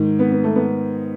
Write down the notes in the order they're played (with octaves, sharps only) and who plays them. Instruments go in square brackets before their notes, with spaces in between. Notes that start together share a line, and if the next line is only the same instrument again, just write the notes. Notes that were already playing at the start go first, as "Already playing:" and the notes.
Already playing: [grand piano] G#2 D#3
B3
B3
A3
B3